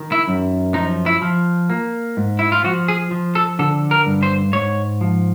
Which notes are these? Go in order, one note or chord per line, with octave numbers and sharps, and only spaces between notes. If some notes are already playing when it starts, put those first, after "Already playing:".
Already playing: D#3
E4
F#2
F3 D#4
E4
F3
A#3
G#2
E4
F4
F3 F#4
G#4
F3
A4
D3 A4
A#4
G2
C5
G#2 C#5
F3